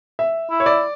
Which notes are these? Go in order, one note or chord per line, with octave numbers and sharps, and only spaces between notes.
E5
E4
C#5
D5